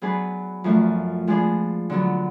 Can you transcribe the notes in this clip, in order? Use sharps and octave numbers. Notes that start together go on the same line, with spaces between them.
F#3 B3 D4 G#4 B4
F#2 F3 A3 D4
F3 G#3 B3 D4 G#4
D3 F#3 B3